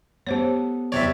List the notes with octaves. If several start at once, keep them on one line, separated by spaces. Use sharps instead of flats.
B3 G4 A4 C5 C#5
E2 C3 C#5 D5 E5